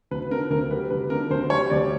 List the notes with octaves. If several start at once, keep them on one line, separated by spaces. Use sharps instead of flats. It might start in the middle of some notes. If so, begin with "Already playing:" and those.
D2 B4
D3 A#4
D2 A#4
G3 B4
D2 B4
D3 A#4
D2 C5
G3 C#5
D2 D5